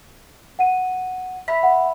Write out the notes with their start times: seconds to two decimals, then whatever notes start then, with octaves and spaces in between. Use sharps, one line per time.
0.59 F#5 D#7
1.48 E5 B5 B6
1.63 F#5